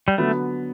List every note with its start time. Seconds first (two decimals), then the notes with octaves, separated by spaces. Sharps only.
0.08 G3
0.18 D3 F#3 A3 B3